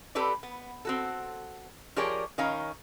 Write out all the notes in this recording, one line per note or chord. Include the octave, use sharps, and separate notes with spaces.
C4 G4 A4 B4 D5
B3
C4 F#4 A4
F3 G4 G#4 A#4 C#5 D5
D#3 C#4 D#4 F5 A#5